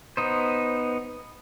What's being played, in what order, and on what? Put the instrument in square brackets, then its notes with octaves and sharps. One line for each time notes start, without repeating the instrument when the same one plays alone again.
[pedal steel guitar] B3 D#4 C5